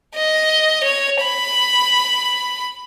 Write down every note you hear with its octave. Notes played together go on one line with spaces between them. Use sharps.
D#5
C#5
B5